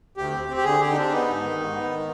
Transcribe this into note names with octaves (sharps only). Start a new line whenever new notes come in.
D2 G4
C4
C4
G4
D3 G#4
D3 G4
D#4
C4 D4
B3 D#4
G#2
D#3
G#2
B3
D#3